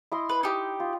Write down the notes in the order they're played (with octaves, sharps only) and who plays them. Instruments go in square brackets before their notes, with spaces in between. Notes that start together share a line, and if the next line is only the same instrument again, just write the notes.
[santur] E4 D#5 C6
[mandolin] B4
D#4 G4
[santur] F4